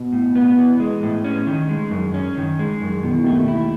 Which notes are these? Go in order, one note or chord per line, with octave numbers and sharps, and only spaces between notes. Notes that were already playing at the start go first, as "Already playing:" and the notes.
Already playing: B2
A2
B3
E3
G#3
A2
C#4
D#3
G#3
F#2
C#4
D#3
G#3
F#2
B2 D#3
E3
D#2 D#3 A3
E4